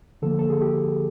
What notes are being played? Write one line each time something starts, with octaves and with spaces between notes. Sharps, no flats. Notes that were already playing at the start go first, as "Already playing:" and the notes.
D3 F3 A#3 A4
A4
G#4
G4